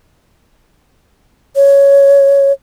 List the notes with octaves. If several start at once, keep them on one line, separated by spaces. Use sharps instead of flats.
C#5